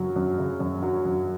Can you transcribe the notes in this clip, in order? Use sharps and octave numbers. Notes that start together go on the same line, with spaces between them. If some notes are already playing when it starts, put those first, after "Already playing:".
Already playing: F#2 C#3 F#3
F#2
C#3
F#2
F#3
F#2